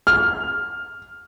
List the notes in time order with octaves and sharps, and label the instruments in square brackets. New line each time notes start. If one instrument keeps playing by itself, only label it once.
[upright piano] F6